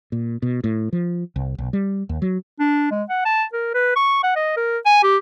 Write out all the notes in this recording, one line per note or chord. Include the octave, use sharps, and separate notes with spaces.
A#2
B2
A2
F3
C2
B1
G3
D#2
F#3
D4
G#3
F#5
A5
A#4
B4
C#6
F#5
D#5
A#4
G#5
G4